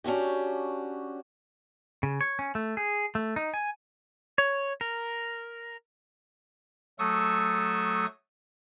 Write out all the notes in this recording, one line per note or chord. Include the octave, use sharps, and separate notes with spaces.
C#4 D4 F#4 G4
C#3
C#5
C#4
A3
G#4
A3
D#4
G#5
C#5
A#4
F#3 A3 A4 C#6 D#6 E6